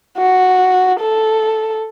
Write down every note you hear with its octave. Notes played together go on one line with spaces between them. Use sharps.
F#4
A4